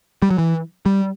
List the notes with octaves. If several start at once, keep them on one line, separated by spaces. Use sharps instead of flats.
G3
F#3
E3
G3